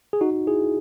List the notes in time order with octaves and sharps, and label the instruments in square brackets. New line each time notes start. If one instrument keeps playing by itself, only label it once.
[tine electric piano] G#4
D#4 F#4
E4 G#4